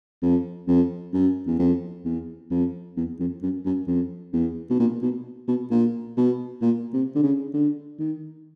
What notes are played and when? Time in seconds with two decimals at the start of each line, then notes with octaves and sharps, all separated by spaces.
0.22 F2
0.67 F2
1.13 F#2
1.46 E2
1.58 F2
2.05 E2
2.50 F2
2.96 E2
3.19 F2
3.42 F#2
3.65 F#2
3.87 F2
4.33 E2
4.70 B2
4.79 A#2
5.02 B2
5.48 B2
5.71 A#2
6.17 B2
6.61 A#2
6.93 C3
7.15 D3
7.22 C#3
7.53 D3
7.99 D#3